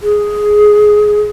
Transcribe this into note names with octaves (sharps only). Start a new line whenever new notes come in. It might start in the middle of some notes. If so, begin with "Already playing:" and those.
G#4